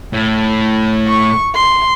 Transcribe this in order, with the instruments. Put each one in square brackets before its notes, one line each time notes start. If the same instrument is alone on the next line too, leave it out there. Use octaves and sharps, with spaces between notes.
[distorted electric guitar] A2
[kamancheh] C#6
C6